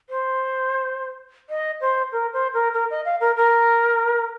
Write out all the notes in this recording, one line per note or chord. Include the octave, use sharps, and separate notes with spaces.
C5
D#5
C5
A#4
C5
A#4
A#4
D#5
F5
A#4
A#4